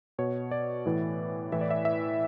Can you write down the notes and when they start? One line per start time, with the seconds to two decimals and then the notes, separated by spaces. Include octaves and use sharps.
0.19 B2 C#5
0.51 D5
0.86 A2 E3
1.52 A2 E3 E5
1.61 D5
1.71 E5
1.85 E5